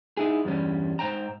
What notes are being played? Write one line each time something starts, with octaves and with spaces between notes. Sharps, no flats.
D#4 E4 G#4
E2 G2 G3 C#4
G#2 C5 G5 A#5